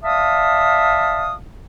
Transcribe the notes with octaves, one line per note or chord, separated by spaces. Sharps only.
D5 E5 F5 A5 D#6